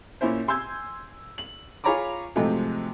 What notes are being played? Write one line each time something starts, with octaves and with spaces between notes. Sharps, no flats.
A#2 C#4 E4 C5
G#5 C6 E6 G6 G#6
F#7
F4 G#4 C#5 A#5 B5 D6
G#2 C3 F3 F#3 G#3 A3